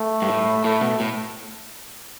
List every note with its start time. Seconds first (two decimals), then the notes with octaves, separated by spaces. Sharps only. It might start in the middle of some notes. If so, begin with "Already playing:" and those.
Already playing: A3
0.22 G2
0.29 A2
0.64 A2 A3
0.81 B2
1.00 A2